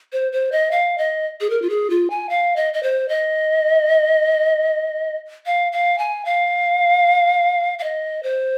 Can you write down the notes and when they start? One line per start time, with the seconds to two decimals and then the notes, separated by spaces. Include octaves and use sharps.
0.13 C5
0.32 C5
0.52 D#5
0.71 F5
0.98 D#5
1.41 G#4
1.50 A#4
1.62 F4
1.70 G#4
1.90 F4
2.10 G#5
2.29 F5
2.56 D#5
2.74 D#5
2.83 C5
3.09 D#5
5.46 F5
5.72 F5
5.98 G#5
6.25 F5
7.79 F5
7.83 D#5
8.23 C5